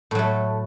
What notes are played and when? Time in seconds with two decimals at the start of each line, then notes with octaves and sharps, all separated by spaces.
0.11 A2
0.15 F#3
0.19 A3